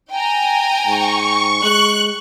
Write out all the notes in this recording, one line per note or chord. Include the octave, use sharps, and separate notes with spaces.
G5 G#5 A#5
G#2 C#6
G#3 F#6